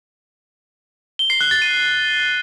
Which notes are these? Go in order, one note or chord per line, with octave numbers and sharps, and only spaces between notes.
G7
C7
F#6
A6
D#7